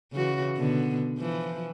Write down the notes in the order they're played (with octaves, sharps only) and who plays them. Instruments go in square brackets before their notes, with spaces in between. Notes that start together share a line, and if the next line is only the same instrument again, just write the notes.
[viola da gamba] C#3 E3 F#4
B2 D3 B3
E3 F3